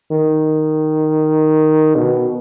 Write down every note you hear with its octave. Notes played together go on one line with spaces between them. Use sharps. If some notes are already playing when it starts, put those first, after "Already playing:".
D#3
B2